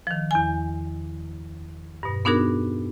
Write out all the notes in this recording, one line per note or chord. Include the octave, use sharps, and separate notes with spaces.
D#3 F3
E2 G#5
G2 B2
B3 D4 D#4 F#4 G#4 A#4